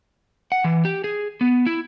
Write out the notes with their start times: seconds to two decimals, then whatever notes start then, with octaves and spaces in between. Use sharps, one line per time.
0.52 F#5
0.64 E3
0.85 G4
1.04 G#4
1.41 B3
1.66 E4